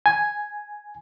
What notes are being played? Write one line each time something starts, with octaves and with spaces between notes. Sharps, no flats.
G#5